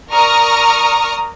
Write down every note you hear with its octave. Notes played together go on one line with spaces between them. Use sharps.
A#4 D5 A#5 C#6 D#6 F6